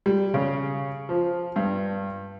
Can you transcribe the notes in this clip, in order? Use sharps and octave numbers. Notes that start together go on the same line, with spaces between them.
G3
C#3
F3
G2